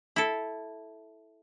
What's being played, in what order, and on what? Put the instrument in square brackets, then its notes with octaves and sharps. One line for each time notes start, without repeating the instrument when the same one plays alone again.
[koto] E4 A4